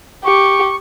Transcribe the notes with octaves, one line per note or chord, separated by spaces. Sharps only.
G4 C#6